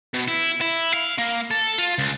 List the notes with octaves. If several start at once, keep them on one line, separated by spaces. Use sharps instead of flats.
B2
E4
E4
F5
A#3
A4
F4
C#2